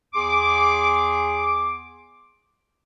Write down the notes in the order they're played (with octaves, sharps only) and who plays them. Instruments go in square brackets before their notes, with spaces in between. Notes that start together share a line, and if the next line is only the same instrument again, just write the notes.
[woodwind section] E2 G#4 C6 D6